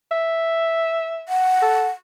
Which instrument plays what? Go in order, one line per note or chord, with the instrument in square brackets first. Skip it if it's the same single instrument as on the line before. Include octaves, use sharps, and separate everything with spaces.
[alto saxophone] E5
[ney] F#5
[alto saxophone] A4